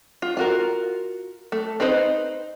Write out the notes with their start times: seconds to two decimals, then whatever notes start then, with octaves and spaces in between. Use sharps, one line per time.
0.22 F4
0.37 F4 F#4 A#4
1.52 A3
1.80 C4 D#4 B4 C5 D#5